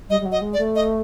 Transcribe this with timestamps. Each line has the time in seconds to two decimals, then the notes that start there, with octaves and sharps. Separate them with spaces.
0.09 G3 D#5
0.21 G3
0.26 F#3
0.32 D#5
0.42 G#3
0.53 D5
0.58 A3
0.75 D#5